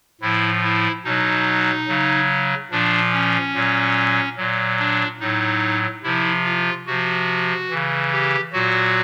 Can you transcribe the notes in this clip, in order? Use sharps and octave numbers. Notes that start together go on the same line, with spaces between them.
A2 F3 E4
E4
B2 F#3 D#4
C#3 F#3
A#2 F3 D4
C#4
A#2 F#3
A#2 F#3
D4
A2 F#3 D#4
C3 F3 E4
F4
C3 F3 F#4
C#3 E3
G4
A#2 F#3 F#4